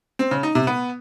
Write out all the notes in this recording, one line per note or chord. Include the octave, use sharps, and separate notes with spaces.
C4
C#3
D#4
C3
B3